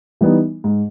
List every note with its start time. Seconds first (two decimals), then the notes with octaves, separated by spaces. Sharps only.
0.21 E3 G3 B3 D#4
0.64 G#2